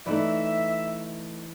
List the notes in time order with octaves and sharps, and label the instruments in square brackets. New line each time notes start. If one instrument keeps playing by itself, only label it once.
[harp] E3 [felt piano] A3 D#4 D5 [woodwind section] E5